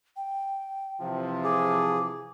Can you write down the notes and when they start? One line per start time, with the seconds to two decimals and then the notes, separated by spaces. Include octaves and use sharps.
0.16 G5
1.01 C3 E3 F3
1.44 G#4 D6